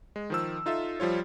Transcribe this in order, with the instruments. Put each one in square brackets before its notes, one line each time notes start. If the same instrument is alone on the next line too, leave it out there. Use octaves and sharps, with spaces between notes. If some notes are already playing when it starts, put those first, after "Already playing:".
[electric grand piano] G#3
D#3 F3 E6
D#4 F4 A4 E5
F3 G3 F4 C#5